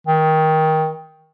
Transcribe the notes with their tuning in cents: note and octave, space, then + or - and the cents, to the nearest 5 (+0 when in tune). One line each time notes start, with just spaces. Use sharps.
D#3 +20